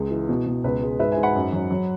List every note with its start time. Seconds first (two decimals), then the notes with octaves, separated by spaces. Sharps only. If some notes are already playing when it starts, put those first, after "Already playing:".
Already playing: C#2 G#3
0.11 E3
0.29 B2
0.47 B2
0.64 C#2 B4
0.82 G#3
0.99 G#2 B4 E5
1.11 E5 G#5
1.17 G#2
1.23 F#5 B5
1.35 F#2
1.53 F#3
1.71 F#3